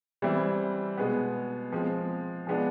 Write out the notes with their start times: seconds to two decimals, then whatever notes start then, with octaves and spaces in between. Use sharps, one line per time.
0.22 E3 G3 C4 E4
0.98 B2 G#3 B3
1.72 F3 G#3 C4
2.47 F3 G#3 B3 D4